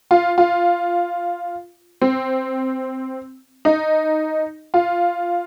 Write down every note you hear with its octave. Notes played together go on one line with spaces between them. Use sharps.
F4
F4
C4
D#4
F4